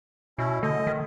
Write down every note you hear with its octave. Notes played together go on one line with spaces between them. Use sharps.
B2 C#4 E4
D3 A3 D#5
D#3